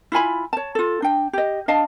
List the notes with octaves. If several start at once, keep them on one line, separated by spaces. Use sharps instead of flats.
E4 F4 G#5 B5
C#5 A5
F4 A4
D4 G5
G4 D#5
D4 D#5 F5 A5